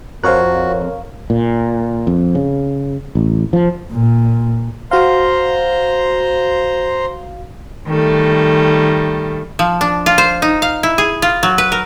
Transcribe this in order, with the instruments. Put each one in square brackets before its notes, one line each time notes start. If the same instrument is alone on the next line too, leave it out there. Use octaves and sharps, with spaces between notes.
[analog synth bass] F2 [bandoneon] F#4 [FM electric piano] A#4 C#5 F5 [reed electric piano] C5 F#6
[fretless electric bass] A#2
F2
C#3
A1
F3
[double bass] A#2
[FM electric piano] F#4 F5 [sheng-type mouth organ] C5 A#5 C6
[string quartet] D#3 G3 A3
[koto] F3
D4
F4
C5
D#4
F5
E4
G#4
F4
F#3
B4
A#4